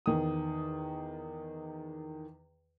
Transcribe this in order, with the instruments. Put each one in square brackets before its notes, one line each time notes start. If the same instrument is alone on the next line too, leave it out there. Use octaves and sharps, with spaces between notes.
[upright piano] E2 D#3 D#6